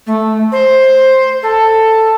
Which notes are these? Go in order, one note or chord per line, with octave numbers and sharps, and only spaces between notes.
A3
C5
A4